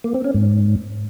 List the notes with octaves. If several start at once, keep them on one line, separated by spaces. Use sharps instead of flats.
A#3
C4
C#4
G#2